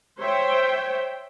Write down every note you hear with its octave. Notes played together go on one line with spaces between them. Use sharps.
C5 C#5 E5 G5